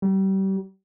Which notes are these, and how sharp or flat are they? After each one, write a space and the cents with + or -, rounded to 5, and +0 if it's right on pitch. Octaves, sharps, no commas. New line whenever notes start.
G3 -30